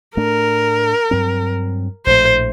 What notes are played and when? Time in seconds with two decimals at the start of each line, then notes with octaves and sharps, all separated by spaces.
0.17 A2 A3 D4 A#4
1.11 G2 F#3 C4
2.06 A#1 A2 A3 C5